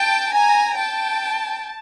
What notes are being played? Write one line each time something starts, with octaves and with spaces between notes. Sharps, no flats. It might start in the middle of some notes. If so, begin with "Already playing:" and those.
Already playing: G5 A5
G#5 A#5
G5 A5